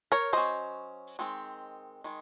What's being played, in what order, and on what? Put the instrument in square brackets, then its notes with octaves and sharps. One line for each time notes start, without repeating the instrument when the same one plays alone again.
[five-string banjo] A#4 C#5
F#3 C#4 C5 D#5
D#3 G#3 C4
D#3 G#3